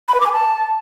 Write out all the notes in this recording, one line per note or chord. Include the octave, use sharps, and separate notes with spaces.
B5
B4
D6
G#5
A5